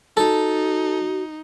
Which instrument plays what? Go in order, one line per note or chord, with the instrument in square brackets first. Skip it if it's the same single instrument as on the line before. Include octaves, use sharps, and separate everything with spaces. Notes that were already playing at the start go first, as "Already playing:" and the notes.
[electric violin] D#4 [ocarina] F#4 [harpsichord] A4